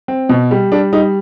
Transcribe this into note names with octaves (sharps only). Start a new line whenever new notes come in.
C4
B2
G3
G3 D4
G3 D#4